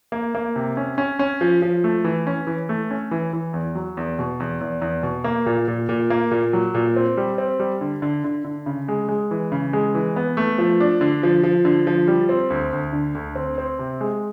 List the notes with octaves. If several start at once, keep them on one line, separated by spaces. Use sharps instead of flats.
A#3
A#3
C3
C#4
C#4
C#4
F3
F3
A3
E3
C#4
E3
A3
C#4
E3
E3
E2
F#3
E2
B2
E2
E2
E2
B2
A#3
A#2
A#2
A#2
A#3
A#2
F#3
A#2
C4
G3
C4
G3
D3
D3
D3
D3
C#3
G#3
G#3
E3
C#3
G#3
E3
B3
A3
F3
D4
D3
F3
F3
D3
F3
G3
C4
D2
D2
D3
D2
C4
C4
C3
G#3